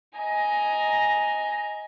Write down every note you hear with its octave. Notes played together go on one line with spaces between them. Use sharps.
D#5 G#5 A#5